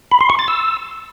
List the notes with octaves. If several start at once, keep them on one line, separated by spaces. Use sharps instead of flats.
B5
C6
C#6
A6
E6